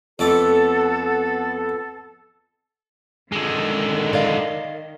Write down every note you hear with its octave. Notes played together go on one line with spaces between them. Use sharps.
F2 A3 B3 A4 D6
D3 D#3 G#3
D5 D#5 F5